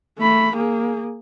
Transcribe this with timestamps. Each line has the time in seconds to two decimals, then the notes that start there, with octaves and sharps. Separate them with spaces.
0.19 A3 B5
0.55 A#3 G#4